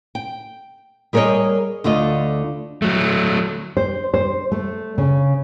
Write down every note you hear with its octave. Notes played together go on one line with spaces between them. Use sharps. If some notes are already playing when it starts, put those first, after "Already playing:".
G5
G3 G#4 A#4 C5 C#5 D#5
D2 D3 A3 F4 D#5
F#3 A3
C5
C5
A3
C#3